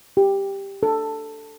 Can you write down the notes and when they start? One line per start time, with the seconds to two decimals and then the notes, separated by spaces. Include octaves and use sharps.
0.17 G4
0.83 A4